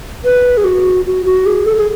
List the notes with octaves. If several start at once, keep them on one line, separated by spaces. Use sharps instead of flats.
B4
G#4
F#4
F#4
F#4
G#4
A4
G#4